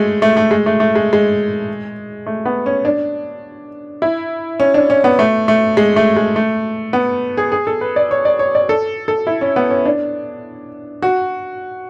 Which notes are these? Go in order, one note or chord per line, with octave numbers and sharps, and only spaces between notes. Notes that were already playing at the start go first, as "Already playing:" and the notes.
Already playing: G#3 A3
A3
A3
G#3
A3
A3
G#3
G#3
A3
B3
C#4
D4
E4
C#4
D4
C#4
B3
A3
A3
G#3
A3
G#3
A3
B3
G#4
G#4
A4
B4
D5
C#5
D5
C#5
D5
A4
A4
E4
C#4
B3
C#4
D4
F#4